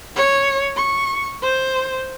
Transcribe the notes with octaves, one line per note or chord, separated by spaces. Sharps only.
C#5
C#6
C5